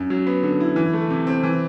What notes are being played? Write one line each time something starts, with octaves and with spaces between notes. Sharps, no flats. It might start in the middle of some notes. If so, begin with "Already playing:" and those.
Already playing: F#2
F#3
B3
D3
E4
E3
A3
C3
C4
E3